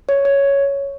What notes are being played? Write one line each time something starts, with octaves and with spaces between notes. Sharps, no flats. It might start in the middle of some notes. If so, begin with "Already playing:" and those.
C#5
C#5